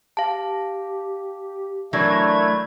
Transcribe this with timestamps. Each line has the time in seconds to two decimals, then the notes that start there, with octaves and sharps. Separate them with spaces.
0.17 G4 F5 A5
1.93 E3 F#3 A3 D4 A#4 G#6